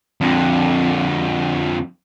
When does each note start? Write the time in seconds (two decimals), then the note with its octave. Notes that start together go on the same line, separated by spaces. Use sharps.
0.21 F2 D3